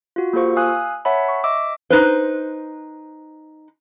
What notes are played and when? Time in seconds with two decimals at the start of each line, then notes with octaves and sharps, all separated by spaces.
0.16 F4 F#4
0.33 A#3 F4 G4 A4 C5 C#6
0.57 F5 G#5 D#6 E6 F#6
1.05 C#5 E5 F#5 A5 B5
1.29 C#6
1.44 D#5 E5 D6 E6
1.90 D#4 B4 C5